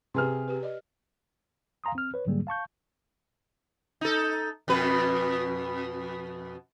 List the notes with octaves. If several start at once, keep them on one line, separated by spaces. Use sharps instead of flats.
C3 G4 G#4 B4 C6 F6
G4 B4
D5 D#5
F5 G#5 A#5 C6 D#6
C4 F6
B4 C#5
G#2 D3 F#3 G3 A#3 G#4
F5 A5 C#6 G6
D#4 A4
F2 B2 B4